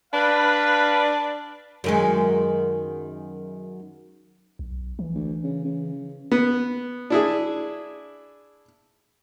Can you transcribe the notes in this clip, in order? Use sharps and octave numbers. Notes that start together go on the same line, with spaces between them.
D4 B4 F5
F#2 D#3 G#3
B1
E3
D2
C#3
C#3
B3
D4 E4 G#4